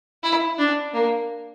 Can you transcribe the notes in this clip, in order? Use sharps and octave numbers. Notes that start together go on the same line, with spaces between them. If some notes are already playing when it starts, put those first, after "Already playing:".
E4
D4
A#3